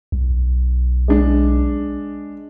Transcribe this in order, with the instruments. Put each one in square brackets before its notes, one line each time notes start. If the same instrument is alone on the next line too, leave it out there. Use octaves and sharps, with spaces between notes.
[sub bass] B1
[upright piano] G#3 D4